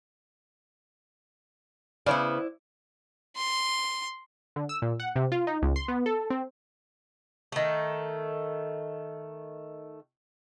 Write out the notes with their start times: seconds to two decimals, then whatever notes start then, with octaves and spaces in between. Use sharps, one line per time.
2.06 C#3 B3 E4 C5 D5
3.37 C6
4.56 D3
4.69 E6
4.82 A#2
5.00 F#5
5.16 C3
5.32 F4
5.47 D#4
5.62 C#2
5.76 C6
5.88 B3
6.06 A4
6.30 C4
7.52 D#3 A3